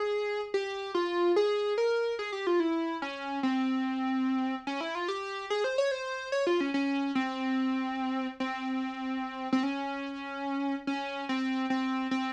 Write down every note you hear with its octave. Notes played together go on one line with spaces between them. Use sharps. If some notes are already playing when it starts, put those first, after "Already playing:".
Already playing: G#4
G4
F4
G#4
A#4
G#4
G4
F4
E4
C#4
C4
C#4
E4
F4
G4
G#4
C5
C#5
C5
C#5
F4
C#4
C#4
C4
C4
C4
C#4
C#4
C4
C4
C4